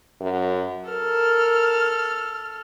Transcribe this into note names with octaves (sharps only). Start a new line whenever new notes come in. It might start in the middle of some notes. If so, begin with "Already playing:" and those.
F#2
A4 A#4 F6